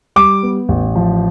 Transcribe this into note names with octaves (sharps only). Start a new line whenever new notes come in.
G3 D6
B3
A1
F3